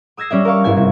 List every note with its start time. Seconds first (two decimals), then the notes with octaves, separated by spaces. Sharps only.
0.17 D#6 E6 G#6 A#6 C7
0.30 G3 C#4 D5 E5
0.45 A#4 C#5 F5 C#6
0.64 G1 G#2 E4 G#5 G#6
0.76 C3 E4